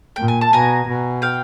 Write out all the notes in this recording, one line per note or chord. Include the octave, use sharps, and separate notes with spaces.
A#2 G5
G#5
A5
B2 G#5 A#5
B2
F5 G5